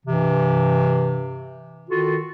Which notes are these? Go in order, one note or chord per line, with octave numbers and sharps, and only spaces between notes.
G2 C3 E3
D#3 F4 F#4 A4